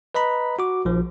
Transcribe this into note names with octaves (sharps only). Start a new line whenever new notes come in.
B4 D#5 A#5 B5
F#4 D6
A#1 F3